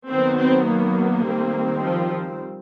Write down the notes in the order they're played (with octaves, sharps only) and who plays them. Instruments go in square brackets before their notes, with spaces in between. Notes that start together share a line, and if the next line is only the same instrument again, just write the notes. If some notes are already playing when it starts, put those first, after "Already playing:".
[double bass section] D#3 F#3 B3 [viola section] C4
[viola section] C4
A#3
[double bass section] D#3 G3 C4
[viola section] F3